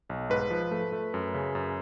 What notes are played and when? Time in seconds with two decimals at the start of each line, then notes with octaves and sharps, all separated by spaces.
0.09 B1
0.30 G#2 B4
0.50 F3
0.71 A3
0.92 A3
1.14 F#2
1.34 C#3
1.55 F#2